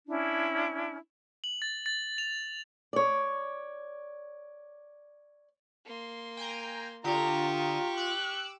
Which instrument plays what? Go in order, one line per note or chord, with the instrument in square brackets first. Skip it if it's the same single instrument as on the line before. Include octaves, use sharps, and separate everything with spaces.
[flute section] C#4 D4 E4
[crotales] F#7
A6
A6
F7
[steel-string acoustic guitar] C#5 D5
[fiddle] A#3 C6
[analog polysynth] G5 G#5 A#5
[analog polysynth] D3 D#6 E7 [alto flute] F4 [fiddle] G4 C#6 [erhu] A#5
[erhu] A#5
[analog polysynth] D6 E6 [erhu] F#6